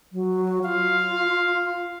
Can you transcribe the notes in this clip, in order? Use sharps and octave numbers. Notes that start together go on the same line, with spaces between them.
F#3
F4 F5